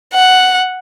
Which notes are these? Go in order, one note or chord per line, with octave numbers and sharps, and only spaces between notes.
F#5